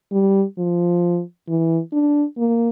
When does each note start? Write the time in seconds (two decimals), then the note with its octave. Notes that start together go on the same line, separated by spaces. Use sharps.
0.12 G3
0.58 F3
1.48 E3
1.93 D4
2.38 A#3